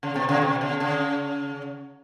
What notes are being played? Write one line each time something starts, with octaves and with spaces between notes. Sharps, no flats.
C#3
B2
C#3
B2
C#3
C#3